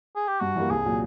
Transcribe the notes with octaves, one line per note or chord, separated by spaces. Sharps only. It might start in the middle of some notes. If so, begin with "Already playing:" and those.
G#4
G4
G2 F#4
E3 G3 A#3
C2 G#4
A#2 F#3